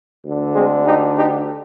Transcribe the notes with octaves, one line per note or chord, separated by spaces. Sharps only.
D2 D3
G#3 C4
D#4 G4
D#4 G4